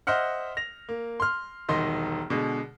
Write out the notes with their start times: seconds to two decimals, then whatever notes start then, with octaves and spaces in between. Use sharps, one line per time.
0.07 C5 D#5 E5 F#5 F6
0.57 A#6 F7
0.89 A#3
1.20 C6 F6
1.69 E1 C2 D#3 D#5 C6
2.30 B2 D3 G#3